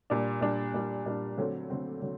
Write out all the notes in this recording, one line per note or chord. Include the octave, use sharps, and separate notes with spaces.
A#2 G3 D4
A#2 G3 D4
A#2 G3 D4
A#2 G3 D4
D3 F#3 A3 C4
D3 F#3 A3 C4
D3 F#3